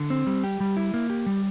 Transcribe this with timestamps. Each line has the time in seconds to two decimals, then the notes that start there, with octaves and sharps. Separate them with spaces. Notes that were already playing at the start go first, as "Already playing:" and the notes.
Already playing: D3
0.10 C4
0.27 G3
0.44 G4
0.60 G3
0.77 E4
0.94 A#3
1.10 G4
1.26 G3